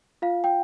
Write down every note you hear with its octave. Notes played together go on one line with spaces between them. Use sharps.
F4 F5
G5